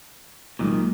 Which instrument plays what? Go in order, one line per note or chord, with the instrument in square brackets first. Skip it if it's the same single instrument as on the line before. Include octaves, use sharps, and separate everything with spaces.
[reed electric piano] C2 F#3 G#3 [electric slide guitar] A#2 D3 D#3